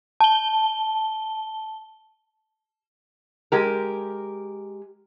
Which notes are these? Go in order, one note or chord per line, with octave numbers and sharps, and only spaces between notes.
A5 G7
G#3 G4 A#4